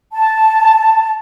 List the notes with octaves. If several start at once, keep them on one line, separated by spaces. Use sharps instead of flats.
A5